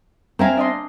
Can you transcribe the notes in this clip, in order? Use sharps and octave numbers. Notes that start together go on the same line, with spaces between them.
C4 A#4 E5 F5 G#5 A#5
D4 D#5 C6